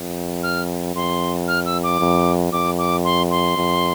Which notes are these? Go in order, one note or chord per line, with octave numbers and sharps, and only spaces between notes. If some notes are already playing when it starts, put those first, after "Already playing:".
Already playing: F2
F6
F2 C6
F6
E6
D6
F2
F2 D6
D6
C6
C6
F2